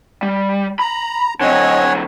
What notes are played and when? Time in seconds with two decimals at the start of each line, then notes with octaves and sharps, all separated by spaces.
0.23 G3
0.80 A#5 B5
1.41 D3 F#3 C4 C#5 D#5 F#5 G#5